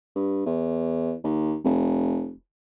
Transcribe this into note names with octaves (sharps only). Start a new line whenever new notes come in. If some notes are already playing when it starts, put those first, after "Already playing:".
G2
E2
D#2
F1